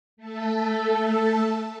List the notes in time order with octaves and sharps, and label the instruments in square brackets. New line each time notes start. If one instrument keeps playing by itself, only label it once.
[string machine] A3 A4